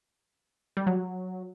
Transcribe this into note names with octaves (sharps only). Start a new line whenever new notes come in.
G3
F#3